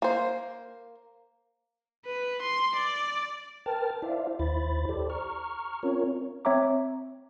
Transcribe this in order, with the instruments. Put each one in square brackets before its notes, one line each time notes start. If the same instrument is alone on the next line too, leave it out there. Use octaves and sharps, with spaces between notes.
[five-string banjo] A#3 C5
[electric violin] B4
C6
D5
[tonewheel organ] A#4 B4 G5 A5 F6 A6
E4 C5 D5 E5 F5
D#2 E4 C5 B5 A6
G4 A4 C5 D5
A#5 C#6 F6
C4 C#4 F4 A#4 C#5
[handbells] C4 C#5 E5 A#5 D6